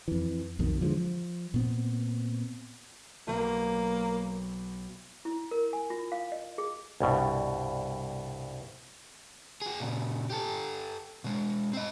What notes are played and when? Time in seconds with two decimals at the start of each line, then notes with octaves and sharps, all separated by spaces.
0.08 F2 E3
0.59 B1 F2 B2 D#3
0.81 D3 E3 F3 G#3
0.97 F3
1.54 A#2 B3 C4
3.27 B1 A#3
5.25 E4
5.51 A#4
5.73 G#5
5.90 F4
6.12 F5
6.32 D#5
6.58 G#4
7.00 C2 G2 B2
9.62 F#4 G#4
9.80 A#2 C#3
10.30 G4 A4
11.24 B2 G#3
11.73 C4 D#5